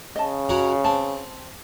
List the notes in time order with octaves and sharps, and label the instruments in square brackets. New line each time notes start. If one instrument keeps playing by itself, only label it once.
[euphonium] C#3 [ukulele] D#5 A5
[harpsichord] C#4 F#4 A#4
[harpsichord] C4 [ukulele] A5